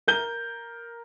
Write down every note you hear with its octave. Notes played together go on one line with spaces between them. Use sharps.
A#4 G6 G7